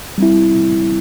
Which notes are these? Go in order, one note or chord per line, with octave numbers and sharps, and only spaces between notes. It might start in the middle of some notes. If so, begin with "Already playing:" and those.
G3 C4 E4